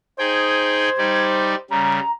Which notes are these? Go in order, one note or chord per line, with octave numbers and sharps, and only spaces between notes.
D#4 G#4 C5 G5 G#6
G3 D#4 D5
C#3 G3 A#5